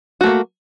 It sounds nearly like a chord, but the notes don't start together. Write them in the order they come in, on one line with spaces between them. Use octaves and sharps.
F#4 A3 A#3